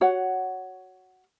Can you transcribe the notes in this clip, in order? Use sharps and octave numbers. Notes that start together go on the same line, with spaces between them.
F#4 C#5 F#5